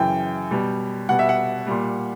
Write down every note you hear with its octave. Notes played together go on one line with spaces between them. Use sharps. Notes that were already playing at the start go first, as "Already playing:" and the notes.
Already playing: F#2 C#3 E3 G5
B2 G3
B2 G3 F#5
E5
F#5
A#2 G3